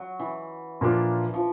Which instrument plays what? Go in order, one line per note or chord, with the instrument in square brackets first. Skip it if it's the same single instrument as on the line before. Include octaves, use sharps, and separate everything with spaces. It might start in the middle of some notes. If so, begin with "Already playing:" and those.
Already playing: [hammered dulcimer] F#3
E3
[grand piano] A#2 F3 A#3 D4 F4
[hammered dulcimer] F3